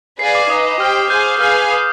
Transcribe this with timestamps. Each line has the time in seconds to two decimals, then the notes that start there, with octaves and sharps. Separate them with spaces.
0.19 G#4 B4 D5 F5 G#5 C7
0.35 D6
0.50 D#4 B4 D#5 D#6
0.80 G4 C5 G5 F6
1.10 G#4 C5 F5 G#5 G6
1.41 G#4 B4 F5 G#5 F6
1.71 D#6